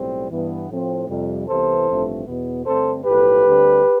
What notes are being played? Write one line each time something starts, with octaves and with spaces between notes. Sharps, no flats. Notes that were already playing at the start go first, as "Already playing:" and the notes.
Already playing: B1 A2 G3 C4
G2 E3 B3
A2 F3 C4
F2 C3 G3
C2 C3 E3 B3 A4 C5
A1 G2 F3 A3 C4
E2 B2 B3
G2 D3 A3 C4 A4 C5
B1 A2 F3 A3 G4 B4
D2 D3 G3 C4